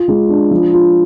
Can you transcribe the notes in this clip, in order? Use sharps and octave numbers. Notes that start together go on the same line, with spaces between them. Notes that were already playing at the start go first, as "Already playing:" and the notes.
Already playing: F4
G#3
D4
F3
F4